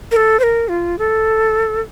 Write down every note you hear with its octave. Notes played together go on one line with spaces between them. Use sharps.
A#4
A4
C5
A#4
F4
A4